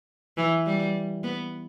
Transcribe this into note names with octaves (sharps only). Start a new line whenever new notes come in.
E3
G3
B3